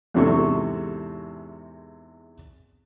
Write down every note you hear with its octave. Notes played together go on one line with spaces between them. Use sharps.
E2 G#2 C3 A4 C#6